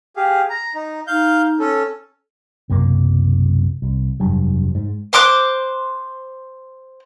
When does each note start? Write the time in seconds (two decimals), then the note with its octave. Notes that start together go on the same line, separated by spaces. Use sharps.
0.16 G4 G#4 F5
0.50 A#5
0.75 D#4
1.07 D#4 F5 G6
1.59 C#4 A4
2.70 B1 F#2 C3 A#3
3.82 C2
4.20 F1 G2 F#3
4.75 G#2
5.13 C5 C6 D6 F#6